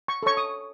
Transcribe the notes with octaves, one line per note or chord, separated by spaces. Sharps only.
C#6
A4 C#5 C#6
D#6